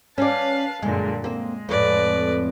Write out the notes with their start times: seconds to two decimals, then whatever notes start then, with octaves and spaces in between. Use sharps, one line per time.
0.18 C#4 B4 D5 F5 A5
0.83 F#2 A#2 D3 G#3
1.24 G#3 A#3 C4
1.69 F2 A2 B4 D5